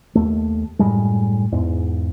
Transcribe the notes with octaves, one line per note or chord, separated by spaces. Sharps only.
D#2 A3
F#2 A2 G3 G#3
E2 G#2